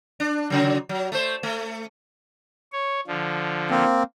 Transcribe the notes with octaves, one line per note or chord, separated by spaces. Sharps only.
D4
C#3 F#3
F#3
A3 C5
A3
C#5
D3 F3
A#3 C4